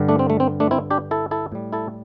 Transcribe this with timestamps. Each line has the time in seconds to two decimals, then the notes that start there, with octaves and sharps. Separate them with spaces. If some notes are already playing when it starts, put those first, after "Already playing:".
Already playing: G2 D3 G3
0.08 A3 D4
0.19 C4
0.30 A3
0.40 C4
0.60 A3 D4
0.71 C4 E4
0.90 D4 G4
1.11 E4 A4
1.31 E4 A4
1.52 A2 G3
1.73 E4 A4